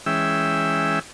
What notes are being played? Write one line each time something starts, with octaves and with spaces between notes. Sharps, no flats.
E3 G#3 C#4 E5 G5 E6